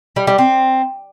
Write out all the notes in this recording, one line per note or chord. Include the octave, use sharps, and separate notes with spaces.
G3
G3
C4